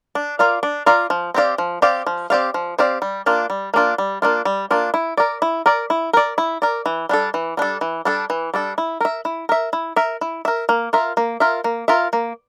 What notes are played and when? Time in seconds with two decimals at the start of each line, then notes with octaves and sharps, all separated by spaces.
0.15 D4
0.39 F4 A#4 D5 F5
0.63 D4
0.86 F4 A#4 D5 F5
1.10 F3
1.34 C4 G4 D5 F5
1.58 F3
1.82 C4 G4 D5 F5
2.07 F3
2.30 C4 G4 D5 F5
2.54 F3
2.79 C4 G4 D5 F5
3.02 G3
3.26 A#3 D4 F4
3.50 G3
3.74 A#3 D4 F4
3.98 G3
4.22 A#3 D4 F4
4.45 G3
4.71 A#3 D4 F4
4.94 E4
5.17 A#4 D5
5.42 E4
5.66 A#4 D5
5.90 E4
6.13 A#4 D5
6.38 E4
6.62 A#4 D5
6.86 E3
7.09 G3 D4 A4
7.34 E3
7.57 G3 D4 A4
7.81 E3
8.05 G3 D4 A4
8.30 E3
8.54 G3 D4 A4
8.78 E4
9.01 A#4 E5
9.25 E4
9.49 A#4 E5
9.73 E4
9.96 A#4 E5
10.21 E4
10.45 A#4 E5
10.69 A#3
10.93 F4 A#4 E5
11.17 A#3
11.40 F4 A#4 E5
11.64 A#3
11.88 F4 A#4 E5
12.13 A#3